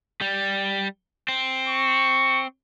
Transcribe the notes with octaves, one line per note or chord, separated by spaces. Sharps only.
G3
C4
C#6